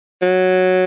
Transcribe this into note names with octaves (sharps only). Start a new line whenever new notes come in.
F#3